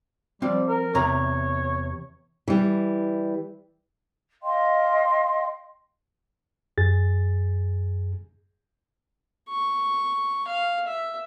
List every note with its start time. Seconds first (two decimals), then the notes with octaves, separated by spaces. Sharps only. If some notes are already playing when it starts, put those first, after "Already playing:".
0.42 F3 G3 C4
0.68 A#4
0.95 E2 C3 C#5 A#5
2.48 E3 G3
4.42 D#5 F5 G5 C6
6.78 F#2 G#4 A6
9.50 C#6
10.47 F5
10.87 E5